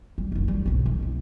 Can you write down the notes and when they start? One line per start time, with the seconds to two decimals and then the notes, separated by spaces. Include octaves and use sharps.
0.18 G3
0.32 F#1 D3
0.48 G3
0.66 B1 G#2
0.86 D#2 A3
1.02 C2